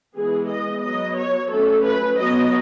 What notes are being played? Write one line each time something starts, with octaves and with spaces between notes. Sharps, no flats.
E3 G#3 B3 G#4
D#5
F#3 B3 D#5
C#5
F#3 A3 C#4 A4
B4
F#3 B3 D#5